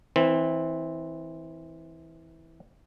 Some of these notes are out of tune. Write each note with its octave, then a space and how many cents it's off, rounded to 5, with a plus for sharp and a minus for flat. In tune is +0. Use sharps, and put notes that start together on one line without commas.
E3 -20 C4 +0